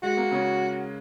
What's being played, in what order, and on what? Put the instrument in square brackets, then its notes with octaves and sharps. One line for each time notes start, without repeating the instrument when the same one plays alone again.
[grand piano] G#3 [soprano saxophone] F#4
[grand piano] A#3
C#3 C#4